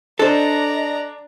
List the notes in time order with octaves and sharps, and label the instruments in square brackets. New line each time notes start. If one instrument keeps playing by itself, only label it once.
[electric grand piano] D4 [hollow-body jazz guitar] A4 C5 [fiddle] D5 A#5 [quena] D#5